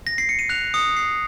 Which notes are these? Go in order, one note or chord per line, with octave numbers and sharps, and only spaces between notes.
A#6
C7
C#7
D#7
F#6 F7
D#6 C#7
F#6 C7